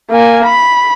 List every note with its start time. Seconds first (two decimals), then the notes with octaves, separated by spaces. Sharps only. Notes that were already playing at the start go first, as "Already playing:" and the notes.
0.11 A#3 G#5
0.45 B5